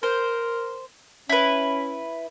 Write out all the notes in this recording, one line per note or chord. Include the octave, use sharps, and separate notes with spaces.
A#4 C5
C#4 E4 B4